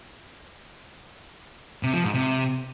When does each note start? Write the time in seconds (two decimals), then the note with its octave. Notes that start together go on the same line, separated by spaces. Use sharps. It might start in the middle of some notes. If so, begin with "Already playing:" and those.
1.83 C3
1.94 F3
2.04 G#2
2.14 C3